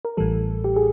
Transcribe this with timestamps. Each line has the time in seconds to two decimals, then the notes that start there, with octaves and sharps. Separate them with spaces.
0.05 A#4
0.17 A1 A2 E3 G3 A4
0.64 G4
0.76 G#4